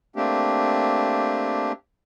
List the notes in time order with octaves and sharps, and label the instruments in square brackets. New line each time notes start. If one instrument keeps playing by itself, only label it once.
[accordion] A3 A#3 C4 D4 G4